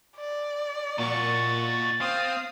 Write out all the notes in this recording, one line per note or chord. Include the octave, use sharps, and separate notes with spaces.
D5
A#2 D#4 F#4 C#6 A6
C4 F5 D#6